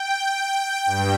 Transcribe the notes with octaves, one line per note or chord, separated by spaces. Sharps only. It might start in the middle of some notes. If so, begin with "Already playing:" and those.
Already playing: G5
G2